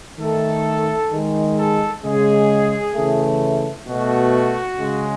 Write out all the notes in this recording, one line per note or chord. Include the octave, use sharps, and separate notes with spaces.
D#3 A3 A4
D#3 G#3
A4
C#3 G#3 G#4
C#3 E3 A3
B2 A3 F#4
C#3 G#3